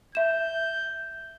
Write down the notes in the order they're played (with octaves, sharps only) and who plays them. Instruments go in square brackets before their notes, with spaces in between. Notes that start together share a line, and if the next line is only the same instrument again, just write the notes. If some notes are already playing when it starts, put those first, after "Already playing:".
[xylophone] E5 E7 [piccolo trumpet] G6